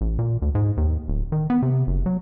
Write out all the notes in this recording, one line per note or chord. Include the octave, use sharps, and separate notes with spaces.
A1
A#2
D2
G#2
D#2
D1
D#3
B3
C3
F#1
F#3